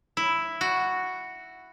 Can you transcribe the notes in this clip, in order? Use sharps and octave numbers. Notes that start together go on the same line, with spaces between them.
E4
F#4